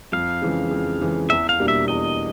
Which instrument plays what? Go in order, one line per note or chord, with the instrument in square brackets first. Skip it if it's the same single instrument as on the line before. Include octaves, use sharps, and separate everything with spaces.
[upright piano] F2 [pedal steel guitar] F5
[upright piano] C#3 E3 G#3
F2
C#3 E3 G#3
[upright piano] E2 [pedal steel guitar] E5
[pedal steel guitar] F5
[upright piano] B2 G3 A#3 D4
[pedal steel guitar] E5
[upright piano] E2 [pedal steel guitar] D#5